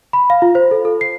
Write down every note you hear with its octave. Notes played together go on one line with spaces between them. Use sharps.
B5
F5
F4
C5
A4
A4
C7